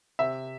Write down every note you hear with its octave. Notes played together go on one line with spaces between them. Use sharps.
C3 E5